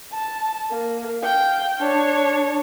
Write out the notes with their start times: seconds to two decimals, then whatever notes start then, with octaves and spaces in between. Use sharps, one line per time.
0.13 A5
0.71 A#3
1.20 F5 G5
1.78 D4 C#5